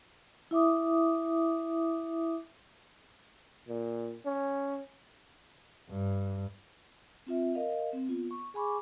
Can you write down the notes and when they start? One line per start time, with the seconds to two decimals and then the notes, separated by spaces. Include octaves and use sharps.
0.51 E4 E5 D6 D#6
3.68 A#2
4.26 C#4
5.89 G2
7.27 C4 F4 E5
7.55 A#4 D#5 F5
7.93 C4
8.09 B3 F4
8.31 C#6
8.54 G#4 G#5 B5 C#6 D6